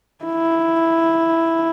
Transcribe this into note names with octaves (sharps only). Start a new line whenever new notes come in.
E4